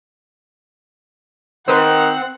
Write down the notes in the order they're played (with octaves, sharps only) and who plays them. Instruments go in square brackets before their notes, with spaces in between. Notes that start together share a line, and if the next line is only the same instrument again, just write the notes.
[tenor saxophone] D#3 [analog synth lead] C4 [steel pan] B4 C5 [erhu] F#5